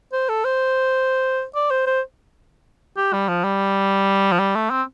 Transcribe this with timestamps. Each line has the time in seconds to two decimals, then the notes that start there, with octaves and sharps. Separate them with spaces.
0.13 C5
0.29 A4
0.45 C5
1.55 D5
1.71 C5
1.86 C5
2.97 G4
3.13 G3
3.29 F3
3.44 G3
4.32 F3
4.39 G3
4.55 A3
4.71 C4